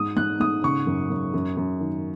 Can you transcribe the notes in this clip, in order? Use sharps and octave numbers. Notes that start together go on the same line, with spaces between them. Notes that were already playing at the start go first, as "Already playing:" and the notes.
Already playing: G#2 D#6
G#2 F#6
G#2 D#6
C#3 C#6
F#2
F#2
F#2
F#2
D#3